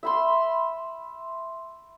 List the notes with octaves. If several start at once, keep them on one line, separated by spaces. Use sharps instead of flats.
E5 B5 C6